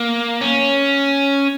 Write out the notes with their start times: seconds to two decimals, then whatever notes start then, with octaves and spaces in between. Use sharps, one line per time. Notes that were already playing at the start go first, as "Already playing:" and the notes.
Already playing: A#3
0.41 C#4